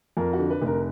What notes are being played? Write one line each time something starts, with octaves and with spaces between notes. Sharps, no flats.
F2 A#4
F#4
D3
B4
F1 A#4